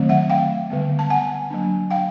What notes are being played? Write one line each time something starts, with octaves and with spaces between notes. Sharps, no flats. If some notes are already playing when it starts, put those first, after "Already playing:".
Already playing: D#3 F#3 A3 C4
E5 F#5
F5 G5
D3 G3 B3
A5
F#5 G#5
F#3 A#3 D4
F5 G5